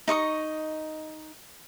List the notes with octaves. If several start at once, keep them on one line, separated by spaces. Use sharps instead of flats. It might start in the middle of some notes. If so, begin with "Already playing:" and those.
D#4 D#5 C#6 D#6